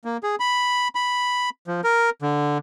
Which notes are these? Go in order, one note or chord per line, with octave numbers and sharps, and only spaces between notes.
A#3
G#4
B5
B5
F3
A#4
D3